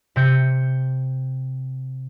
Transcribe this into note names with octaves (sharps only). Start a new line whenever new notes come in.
C3 G6 C#7